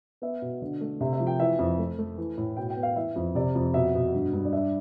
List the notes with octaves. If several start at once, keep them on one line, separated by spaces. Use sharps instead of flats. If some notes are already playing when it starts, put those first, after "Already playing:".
B3 E5
B2
D3
A3
C3 E5
E5
F3
G5
E3 E5
F2
A3
A3
E3
A2
B2 G5
G5
B3
F5
E3 E5
F2
C3 D5
F2
B2 E5
B2
G2
G2
D5
D4 E5